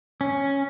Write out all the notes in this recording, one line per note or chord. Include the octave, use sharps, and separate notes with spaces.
C#4